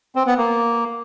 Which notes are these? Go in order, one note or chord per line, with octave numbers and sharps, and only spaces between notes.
C4
B3
A#3